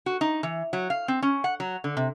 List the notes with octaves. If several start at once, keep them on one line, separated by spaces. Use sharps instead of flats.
F#4
D#4
E3
F#3
F5
C4
C#4
F#5
F#3
D3
C3